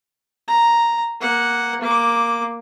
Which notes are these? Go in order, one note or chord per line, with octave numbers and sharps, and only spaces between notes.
A#5
A#3 F#5
A#3 D6